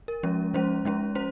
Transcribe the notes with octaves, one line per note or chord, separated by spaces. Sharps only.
A#4
F3 G#3 C#4
F3 G#3 C#4 C5
F3 G#3 C#4
C#4 C5